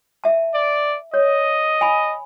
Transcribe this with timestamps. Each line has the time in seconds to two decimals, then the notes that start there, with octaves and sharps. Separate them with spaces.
0.24 E5 A5
0.55 D5
1.14 C#5 D#5
1.81 G#5 B5